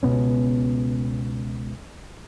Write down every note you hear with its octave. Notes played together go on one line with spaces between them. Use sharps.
C#2 B2 B3 C#4